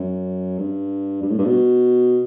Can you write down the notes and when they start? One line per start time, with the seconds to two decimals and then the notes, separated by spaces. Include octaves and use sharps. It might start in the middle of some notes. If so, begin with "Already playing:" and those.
Already playing: F#2
0.58 G2
1.22 G2
1.30 A2
1.38 G2
1.46 B2